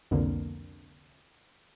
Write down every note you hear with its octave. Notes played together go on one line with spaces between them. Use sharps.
C2 F2 B2 D3 A#3